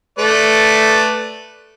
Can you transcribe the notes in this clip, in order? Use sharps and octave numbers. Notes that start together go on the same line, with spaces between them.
A3 B4 D5